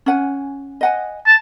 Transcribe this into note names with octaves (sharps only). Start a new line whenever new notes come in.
C#4 F#5 G#5
D#5 F#5 G#5
A5